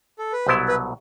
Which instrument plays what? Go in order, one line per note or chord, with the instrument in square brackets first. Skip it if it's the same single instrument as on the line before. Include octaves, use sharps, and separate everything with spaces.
[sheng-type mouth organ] A4
B4
[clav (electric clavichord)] C2 B2 F#3 B3 E4 [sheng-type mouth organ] C5
[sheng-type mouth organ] B4